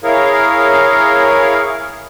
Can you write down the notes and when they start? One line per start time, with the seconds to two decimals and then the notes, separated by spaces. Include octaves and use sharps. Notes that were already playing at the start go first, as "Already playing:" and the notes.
0.04 E4 G#4 A#4 C#5 F5